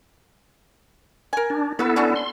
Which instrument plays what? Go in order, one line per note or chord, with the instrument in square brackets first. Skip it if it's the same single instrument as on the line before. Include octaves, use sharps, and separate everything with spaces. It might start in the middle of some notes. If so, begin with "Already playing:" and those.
[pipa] A#4 G#5
[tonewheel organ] D4
[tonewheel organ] B3 E4 A4 [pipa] F#4 B4
[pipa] C#4 D4 F#4
[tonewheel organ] C6